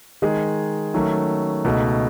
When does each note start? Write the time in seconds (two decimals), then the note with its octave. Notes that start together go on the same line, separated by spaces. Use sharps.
0.22 D#3 G#3 D#4 G#4
0.94 D#3 F#3 A3 C#4
1.65 C#2 B2 A3 D#4